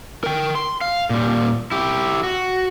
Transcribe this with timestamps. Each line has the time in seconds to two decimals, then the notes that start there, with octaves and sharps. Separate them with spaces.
0.24 A#4 G5
0.55 C6
0.81 F5
1.10 A#2 G3
1.71 E4 G4
2.24 F#4